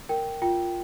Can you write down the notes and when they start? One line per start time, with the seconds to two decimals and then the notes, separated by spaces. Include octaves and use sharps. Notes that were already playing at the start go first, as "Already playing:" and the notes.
0.09 A#4 G5
0.42 F4 G5